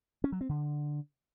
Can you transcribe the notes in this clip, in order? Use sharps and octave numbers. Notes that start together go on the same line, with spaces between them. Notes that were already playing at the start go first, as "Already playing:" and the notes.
C#4
F#3
C4
D3